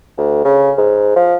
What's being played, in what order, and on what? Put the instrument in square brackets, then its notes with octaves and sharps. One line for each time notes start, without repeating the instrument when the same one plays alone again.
[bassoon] D2
C#3
G#2
F3